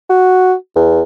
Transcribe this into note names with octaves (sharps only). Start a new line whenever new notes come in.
F#4
E2